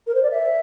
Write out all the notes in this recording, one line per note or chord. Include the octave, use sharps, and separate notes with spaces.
A#4
C5
D5
E5